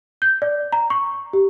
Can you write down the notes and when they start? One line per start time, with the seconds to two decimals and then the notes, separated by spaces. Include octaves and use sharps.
0.22 G6
0.42 D5
0.72 A#5
0.90 C#6
1.33 G4